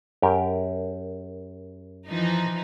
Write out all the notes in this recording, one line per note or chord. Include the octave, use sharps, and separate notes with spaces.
F#2 G4 A#4
E3 F3 D#4